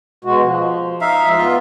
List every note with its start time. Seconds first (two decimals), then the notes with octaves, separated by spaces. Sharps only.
0.25 B2 G#3 F#4
0.42 F3
1.01 D#4 E5 F5
1.24 D2 F3 G#3
1.37 B3 F4